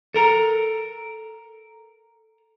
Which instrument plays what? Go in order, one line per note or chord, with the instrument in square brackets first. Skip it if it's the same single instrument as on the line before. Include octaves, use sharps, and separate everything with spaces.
[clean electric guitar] A4 A#4 A#5